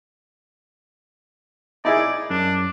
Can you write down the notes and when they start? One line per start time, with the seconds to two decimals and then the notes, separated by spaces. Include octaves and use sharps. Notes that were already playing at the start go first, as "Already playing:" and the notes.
1.85 D#4 E4 G#4 D5
2.30 F#2 D4